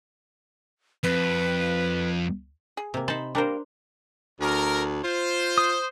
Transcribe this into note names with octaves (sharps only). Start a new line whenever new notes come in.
F2 B4
G#4
C3 A#3
D#4 C5 A5 B5
G3 A#3 D4 A#4 C5
D2 A#4
F4 C5
D#6